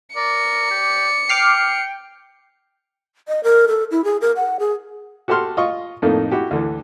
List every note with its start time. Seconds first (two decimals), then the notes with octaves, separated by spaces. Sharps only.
0.16 A#4 D5 C#7
0.71 G4
1.29 G5 D6 F6 C7
3.28 D#5
3.44 A#4
3.68 A4
3.91 E4
4.04 G#4
4.21 A#4
4.36 F#5
4.59 G#4
5.28 F#4 G4 A4 A5 C6 F6
5.57 F4 D#5 C#6
6.02 F2 A2 A3 A#3 D#4
6.31 E4 F#4 G4
6.51 D2 D3 E3